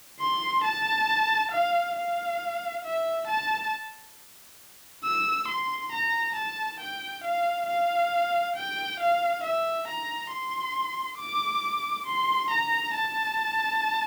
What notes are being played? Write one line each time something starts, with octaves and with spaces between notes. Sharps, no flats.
C6
A5
F5
F5
E5
A5
E6
C6
A#5
A5
G5
F5
F5
G5
F5
E5
A#5
C6
D6
C6
A#5
A5